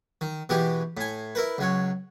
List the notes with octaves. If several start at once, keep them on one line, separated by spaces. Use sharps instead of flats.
D#3
B2 E3 G#3 G4
A2 G#5
E4 A#4 B4
C#2 F#3 C#5